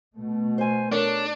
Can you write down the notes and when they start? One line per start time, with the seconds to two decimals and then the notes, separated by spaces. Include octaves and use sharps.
0.14 B2 A3
0.58 C5 G#5
0.92 D4 A4 A#4 C#5